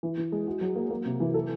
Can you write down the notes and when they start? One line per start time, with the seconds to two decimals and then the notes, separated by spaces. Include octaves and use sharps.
0.03 E3
0.17 E3
0.32 G#3
0.47 F#4
0.61 F#3
0.76 A#3
0.90 A#3
1.06 C3
1.20 E3
1.34 A4